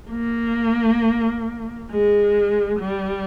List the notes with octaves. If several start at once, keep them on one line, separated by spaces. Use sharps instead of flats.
A#3
G#3
G3